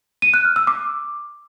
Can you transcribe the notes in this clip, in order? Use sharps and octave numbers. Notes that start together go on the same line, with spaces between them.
D#7
F#6
F6
E6
D6